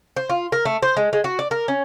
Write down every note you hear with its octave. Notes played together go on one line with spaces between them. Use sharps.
C5
F4
A#4
A3
C5
G#3
G#3
F#4
D5
A#4
C#4